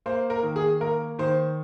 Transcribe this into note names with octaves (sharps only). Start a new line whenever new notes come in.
A#3 C5
A#4
D#3
G#4
A#3 A#4
D#3 C5